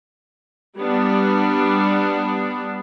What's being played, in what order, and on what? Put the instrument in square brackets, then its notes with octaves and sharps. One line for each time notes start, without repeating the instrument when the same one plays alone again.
[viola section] G3 B3 D4